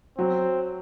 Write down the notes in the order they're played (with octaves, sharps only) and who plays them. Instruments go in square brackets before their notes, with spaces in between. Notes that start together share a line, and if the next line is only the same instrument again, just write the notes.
[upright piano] F#3 [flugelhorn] C4